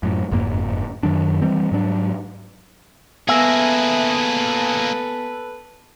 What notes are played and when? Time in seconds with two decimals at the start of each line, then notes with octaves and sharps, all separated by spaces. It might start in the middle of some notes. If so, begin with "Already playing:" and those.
0.03 F#2 A2
0.31 F#1 F2 G#2 A#3
1.03 F#2 D#3 F#3 D4
1.42 E3 G3 C4
1.72 G#2 F#3 D4
3.29 A#3 B3 G#4 A4 B4 E5 G#5 A#6